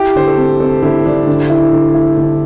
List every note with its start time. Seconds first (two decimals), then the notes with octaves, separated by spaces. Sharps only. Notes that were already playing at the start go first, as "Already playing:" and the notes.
Already playing: E4 G4
0.16 D3 C5
0.27 A4
0.37 C4
0.60 C4 A4
0.82 D3 E4
1.05 D3 D4
1.27 D3
1.50 E4
1.73 D3
1.95 E4
2.17 D3